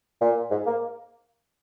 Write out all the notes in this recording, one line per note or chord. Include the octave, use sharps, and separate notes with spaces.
A#2
G#2
A#3